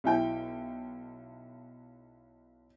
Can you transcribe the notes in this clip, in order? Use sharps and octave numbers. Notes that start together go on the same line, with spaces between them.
B1 E4 G5 G6